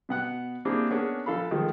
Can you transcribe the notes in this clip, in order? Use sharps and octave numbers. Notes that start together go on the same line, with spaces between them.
B2 B3 F#5 F#6
A#3 C4 D4 E4 G4 G#4
B3 C#4 D4 G#4 A#4
A#1 A4 F5 B5
D#3 F3 G#3 A3